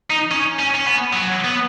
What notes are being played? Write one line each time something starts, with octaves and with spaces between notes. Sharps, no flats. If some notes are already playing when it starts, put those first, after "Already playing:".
D#4
C#4
C#4
C#4
B3
F#3
B3